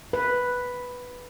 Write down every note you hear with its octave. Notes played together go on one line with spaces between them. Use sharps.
B4